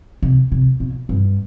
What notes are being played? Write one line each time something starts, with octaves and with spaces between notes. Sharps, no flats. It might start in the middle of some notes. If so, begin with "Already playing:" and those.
C3
C3
B2
G2